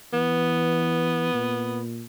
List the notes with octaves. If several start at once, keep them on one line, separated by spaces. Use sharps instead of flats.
E3 B3
A#2